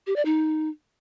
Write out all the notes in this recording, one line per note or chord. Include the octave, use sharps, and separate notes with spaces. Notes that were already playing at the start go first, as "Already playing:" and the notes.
G4
D5
D#4